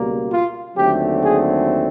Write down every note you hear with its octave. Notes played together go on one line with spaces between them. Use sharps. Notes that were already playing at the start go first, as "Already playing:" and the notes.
Already playing: C#2 B2 G3 A#3
F4
D#2 D3 F#3 A3 C4 G4
G#4